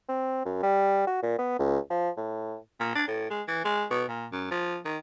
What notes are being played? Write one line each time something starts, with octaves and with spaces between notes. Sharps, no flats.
C4
F#2
G3
F#4
A#2
B3
C#2
F3
A2
A#2
D4
A2
G#3
E3
G#3
B2
A#2
F#2
F3
D#3